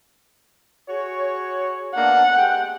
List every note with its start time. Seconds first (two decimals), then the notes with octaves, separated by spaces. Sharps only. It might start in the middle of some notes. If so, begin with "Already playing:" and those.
0.88 F#4 G#4 C#5
1.96 A#3 B3 D4 F#5
2.36 G#3 G4 G5